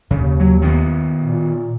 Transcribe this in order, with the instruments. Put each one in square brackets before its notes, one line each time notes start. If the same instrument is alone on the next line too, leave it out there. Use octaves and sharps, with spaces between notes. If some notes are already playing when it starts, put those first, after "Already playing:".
[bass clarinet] D#2 [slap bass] C#3
[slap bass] F#3
D#3 B3
[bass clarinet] A#2